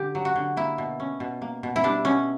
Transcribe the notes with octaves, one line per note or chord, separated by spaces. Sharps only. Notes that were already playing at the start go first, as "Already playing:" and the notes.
Already playing: D3 G4
F#3
F#4
D3
A#3 E4
B2
C#4
B2
A#3
B2
E4
G3 D4
B2 C#4